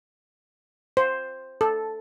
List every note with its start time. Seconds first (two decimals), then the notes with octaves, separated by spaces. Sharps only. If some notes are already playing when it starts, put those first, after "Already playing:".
0.97 C5
1.61 A4